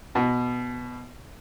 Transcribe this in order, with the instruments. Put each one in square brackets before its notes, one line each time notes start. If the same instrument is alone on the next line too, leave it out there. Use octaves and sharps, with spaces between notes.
[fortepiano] B2